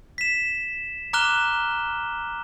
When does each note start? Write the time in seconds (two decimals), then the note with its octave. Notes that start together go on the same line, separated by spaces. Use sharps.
0.18 B6 E7
1.13 A#5 D6 F6 F#6 E7 G7